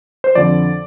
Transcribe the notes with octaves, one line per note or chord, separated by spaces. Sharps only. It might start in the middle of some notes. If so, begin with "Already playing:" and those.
C5
F2 D3 F3 D5